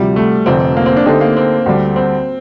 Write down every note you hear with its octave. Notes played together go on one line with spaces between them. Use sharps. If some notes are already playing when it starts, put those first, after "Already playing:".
Already playing: D2 C3 F3 G3
A3
F1 F2 D3 A3 C4
A#3
C4
D4
D3 A3 C4 D#4 G4
A#3
C4
D2 D3 G3
C4